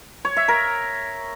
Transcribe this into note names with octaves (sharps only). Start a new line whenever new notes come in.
C#5
E5
A#4